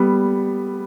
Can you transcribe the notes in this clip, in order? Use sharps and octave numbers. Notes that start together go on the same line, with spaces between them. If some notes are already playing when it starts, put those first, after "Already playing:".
Already playing: G3 B3